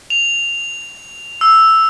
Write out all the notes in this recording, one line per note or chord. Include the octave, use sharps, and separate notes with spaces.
F7
E6